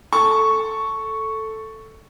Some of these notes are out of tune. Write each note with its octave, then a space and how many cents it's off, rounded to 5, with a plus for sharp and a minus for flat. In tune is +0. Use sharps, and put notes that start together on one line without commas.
A4 +0 C#6 +0